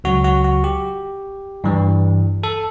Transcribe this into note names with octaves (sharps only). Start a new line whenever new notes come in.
C#2 C#3 F#3 F#4
F#4
F#4
G4
G2 E3 G3
A4